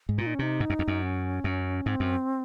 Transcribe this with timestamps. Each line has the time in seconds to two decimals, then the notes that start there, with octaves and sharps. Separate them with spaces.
0.09 G#2
0.18 A#2 F4
0.26 D#4
0.34 C#4
0.39 C3 D#4
0.60 G#2
0.70 F#2
0.79 F2
0.88 F#2
1.02 C#4
1.44 F#2
1.86 G#2 C4
2.00 F#2